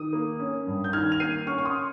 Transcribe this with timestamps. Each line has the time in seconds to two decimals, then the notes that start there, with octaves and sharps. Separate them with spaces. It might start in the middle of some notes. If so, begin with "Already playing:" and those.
Already playing: D#3 D#6
0.13 A#3
0.40 C#4
0.67 G2
0.84 G6
0.93 D#3 F6 G#6
1.12 F7
1.20 A#3 C7 D#7
1.47 C#4 C#6 F6
1.58 C#6
1.65 C6 D#6